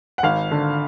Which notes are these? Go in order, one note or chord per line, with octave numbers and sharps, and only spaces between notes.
F#5
G#1 F5
D3